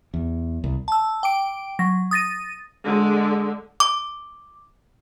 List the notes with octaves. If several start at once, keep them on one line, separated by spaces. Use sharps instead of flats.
E2
C2
A5 E6
G5 D6 D7
F#3 A#6
D#6 A6 A#6 D#7
D3 G#3
D6